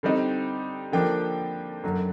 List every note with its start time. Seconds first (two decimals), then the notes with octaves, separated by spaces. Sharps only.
0.03 D3 G3 C4 D#4
0.92 D3 F3 A#3 D4 G5
1.84 F#2 D3 F#3